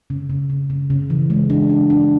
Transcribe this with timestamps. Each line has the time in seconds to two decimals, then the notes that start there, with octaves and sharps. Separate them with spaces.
0.10 C#3
0.30 C#3
0.50 C#3
0.70 C#3
0.90 C#3
1.10 E3
1.30 G#3
1.50 D4
1.70 D4
1.90 D4